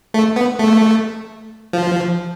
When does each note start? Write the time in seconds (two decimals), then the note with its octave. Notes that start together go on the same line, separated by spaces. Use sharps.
0.14 A3
0.36 B3
0.59 A3
1.73 F3